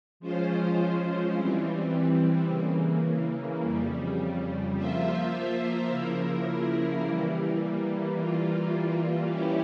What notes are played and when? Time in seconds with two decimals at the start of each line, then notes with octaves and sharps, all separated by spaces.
0.20 F3 G#3 C#4 F4 C5
1.33 E3 G3 C4
2.47 C#3 E3 A#3
3.61 F2 C#3 G3
4.75 F3 A#3 F4 C5 E5
5.88 C#3 F3 A#3 E4 A#4
7.02 E3 G3 A#3
8.15 E3 G3 A#3 F4
9.30 E3 G3 C#4 E4 G4